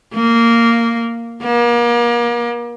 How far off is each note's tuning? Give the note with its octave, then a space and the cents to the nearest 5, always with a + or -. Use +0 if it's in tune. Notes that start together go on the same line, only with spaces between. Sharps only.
A#3 -10
A#3 +35